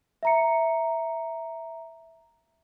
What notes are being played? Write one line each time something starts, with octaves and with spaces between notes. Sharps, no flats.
E5 A#5 C#7